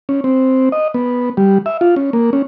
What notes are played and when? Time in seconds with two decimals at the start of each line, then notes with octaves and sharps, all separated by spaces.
0.09 C#4
0.24 C4
0.72 D#5
0.94 B3
1.37 G3
1.66 E5
1.81 F4
1.96 C#4
2.13 A#3
2.33 C#4